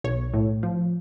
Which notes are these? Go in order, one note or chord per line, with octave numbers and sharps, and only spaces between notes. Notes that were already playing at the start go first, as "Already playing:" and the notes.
B1 C#5
A2
F3